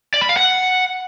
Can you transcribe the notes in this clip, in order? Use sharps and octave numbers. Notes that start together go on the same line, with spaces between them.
D5
B5
F5
F#5